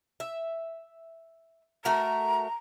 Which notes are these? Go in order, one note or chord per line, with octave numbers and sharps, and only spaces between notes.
E5
A3 F#4 A#4 A#5